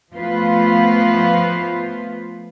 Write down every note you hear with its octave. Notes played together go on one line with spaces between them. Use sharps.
F3 A3 B3 F4 B4 C5